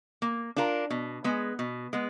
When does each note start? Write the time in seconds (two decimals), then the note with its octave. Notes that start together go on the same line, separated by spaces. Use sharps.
0.22 A#3
0.56 D4 F4 A#4
0.90 B2
1.24 G#3 B3
1.59 B2
1.93 G#3 B3